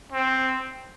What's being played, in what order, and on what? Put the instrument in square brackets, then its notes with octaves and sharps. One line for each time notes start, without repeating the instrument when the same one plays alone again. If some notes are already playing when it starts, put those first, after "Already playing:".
[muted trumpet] C4